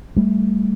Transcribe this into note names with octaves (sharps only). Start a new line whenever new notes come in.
G3 A3